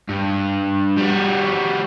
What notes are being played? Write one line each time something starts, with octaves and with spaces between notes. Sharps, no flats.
G2
G3 F#4